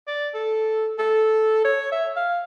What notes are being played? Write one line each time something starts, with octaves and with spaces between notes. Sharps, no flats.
D5
A4
A4
C#5
E5
F5